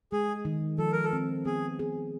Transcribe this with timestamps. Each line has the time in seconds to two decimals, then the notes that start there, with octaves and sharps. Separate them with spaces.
0.12 G#3 G#4
0.45 D#3
0.78 F3 A4
0.92 A#4
1.04 A4
1.13 C4
1.45 B3 G#4
1.79 G#4